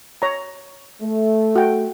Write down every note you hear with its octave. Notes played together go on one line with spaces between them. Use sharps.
C#5 A#5
A3
F#4 G5